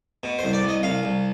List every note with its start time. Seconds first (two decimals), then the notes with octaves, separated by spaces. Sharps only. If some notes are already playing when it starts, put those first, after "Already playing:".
0.23 B2
0.39 C2 C5
0.53 D5
0.63 C2
0.69 D#5
0.83 C2 F5
1.03 C2